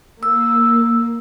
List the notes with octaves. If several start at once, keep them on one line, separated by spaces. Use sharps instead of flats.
A#3 E6